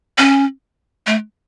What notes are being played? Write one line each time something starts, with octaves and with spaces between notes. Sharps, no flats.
C#4
A3